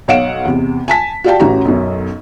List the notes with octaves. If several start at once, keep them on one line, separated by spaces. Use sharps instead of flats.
B1 C#5 F5 F#5 D7 E7
E2 C3
G#5 A5 B6
F#4 G4 D5 F5 G5 A5
A1 C#4 F#4 G4 A#5
B1 F#2